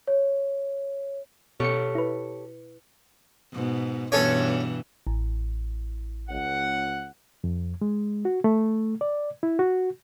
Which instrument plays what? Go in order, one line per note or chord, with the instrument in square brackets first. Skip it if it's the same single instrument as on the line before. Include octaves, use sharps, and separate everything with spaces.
[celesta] C#5
[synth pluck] B2 C#7 [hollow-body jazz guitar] G4 A4 C#5
[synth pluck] E4 B4
[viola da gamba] G#2 B2
[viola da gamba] G2 B2 E3 [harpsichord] C#4 A4 C#5
[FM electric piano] A1
[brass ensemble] C#2 F#5
[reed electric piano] F2
G#3
F#4
A3
D5
E4
F#4